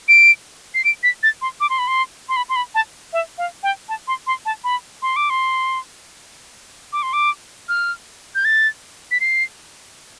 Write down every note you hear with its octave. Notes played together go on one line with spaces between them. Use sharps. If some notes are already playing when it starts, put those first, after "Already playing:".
D7
C7
D7
B6
A6
C6
D6
C6
B5
C6
C6
B5
C6
B5
A5
E5
F5
G5
A5
C6
C6
A5
B5
C6
D6
C6
D6
C6
D6
F6
G6
A6
B6
C7